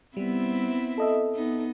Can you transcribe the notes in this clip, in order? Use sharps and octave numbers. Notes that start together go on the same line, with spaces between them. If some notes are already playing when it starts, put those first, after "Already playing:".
G3 B3 C4 E4
A4 D#5 E5
B3 D#4